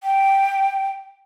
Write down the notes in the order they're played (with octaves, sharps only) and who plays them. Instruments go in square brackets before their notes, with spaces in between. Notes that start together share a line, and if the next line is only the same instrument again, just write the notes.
[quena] G5